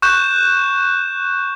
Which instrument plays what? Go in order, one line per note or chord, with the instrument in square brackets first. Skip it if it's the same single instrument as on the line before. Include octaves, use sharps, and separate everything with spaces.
[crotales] C#6 F#6 G6 E7